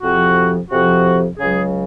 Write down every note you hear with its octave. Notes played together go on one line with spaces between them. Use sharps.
F2 C3 F3 F#4
F2 C3 F3 F#4
C#2 C#3 F#3 G#4